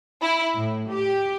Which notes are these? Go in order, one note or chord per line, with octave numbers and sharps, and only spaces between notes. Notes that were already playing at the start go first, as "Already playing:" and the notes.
E4
A2
G4